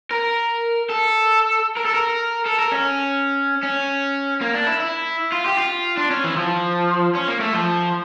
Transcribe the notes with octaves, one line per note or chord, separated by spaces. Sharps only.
A#4
A4
A#4
A4
A#4
A4
A#4
C#4
C#4
A#3
D4
E4
E4
F4
G4
F4
D4
C#4
E3
F3
C#4
A#3
A3
F3